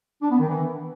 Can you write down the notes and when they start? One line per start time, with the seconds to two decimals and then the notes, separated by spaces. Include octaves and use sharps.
0.22 D4
0.30 B3
0.39 D#3
0.47 E3